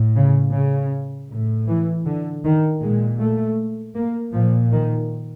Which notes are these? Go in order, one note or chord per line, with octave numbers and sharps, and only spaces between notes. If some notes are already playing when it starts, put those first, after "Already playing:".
Already playing: A2
C#3
C#3
A2
E3
D3
D#3
A#2 G#3
A3
A#3
A#2 F3
D#3